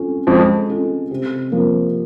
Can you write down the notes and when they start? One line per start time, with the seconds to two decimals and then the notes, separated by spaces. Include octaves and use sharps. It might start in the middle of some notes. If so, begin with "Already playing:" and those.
Already playing: C#4 F4 A4
0.27 F2 F3 G#3
0.69 C#4 F4 A4
1.11 C3
1.52 F3 A#3